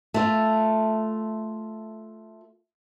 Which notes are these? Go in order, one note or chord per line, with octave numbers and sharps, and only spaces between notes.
A3 F4